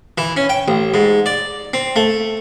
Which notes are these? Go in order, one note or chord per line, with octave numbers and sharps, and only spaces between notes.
E3
C#4
G5
A1
G#2
D5
C4
A3